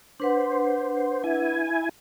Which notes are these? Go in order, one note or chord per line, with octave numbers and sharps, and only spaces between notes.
D4 B4 C5 F#5
E4 G#5